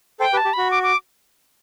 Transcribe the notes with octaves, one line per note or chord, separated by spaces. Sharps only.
A4 C5 G5
G4 B4
A5
G4
F#4 B5
D6
D6